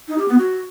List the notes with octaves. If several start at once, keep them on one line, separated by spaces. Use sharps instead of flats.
D#4
G4
B3
F#4